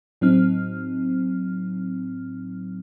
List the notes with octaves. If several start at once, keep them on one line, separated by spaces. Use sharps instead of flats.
A2 F#3 C4 D#4 F6